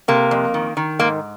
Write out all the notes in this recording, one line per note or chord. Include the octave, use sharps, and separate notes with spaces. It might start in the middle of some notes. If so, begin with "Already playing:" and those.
C3 A#3
F2
D#3
D#3
G#2 A#3